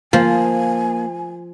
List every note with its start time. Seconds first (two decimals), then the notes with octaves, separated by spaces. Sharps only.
0.13 F3 A#3 G#5